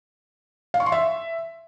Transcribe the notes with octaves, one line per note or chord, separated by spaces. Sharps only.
F5
C#6
C6
E5